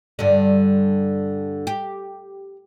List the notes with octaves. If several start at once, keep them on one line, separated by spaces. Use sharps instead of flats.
G2 D3
G4